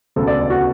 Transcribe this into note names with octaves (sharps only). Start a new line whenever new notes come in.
E1 D2 C#3 A4
D5
F#4